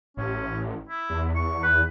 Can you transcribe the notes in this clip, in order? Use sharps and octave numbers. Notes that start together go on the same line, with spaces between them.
A1 C#4
E4
E2
C#6
B4